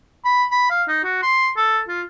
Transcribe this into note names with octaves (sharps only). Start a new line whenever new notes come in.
B5
B5
F5
D#4
F#4
C6
A4
F4